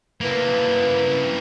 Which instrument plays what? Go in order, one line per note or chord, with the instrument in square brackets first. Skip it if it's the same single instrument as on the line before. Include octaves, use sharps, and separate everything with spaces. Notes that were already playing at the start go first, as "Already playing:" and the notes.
[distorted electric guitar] A#3 E4 [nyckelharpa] B4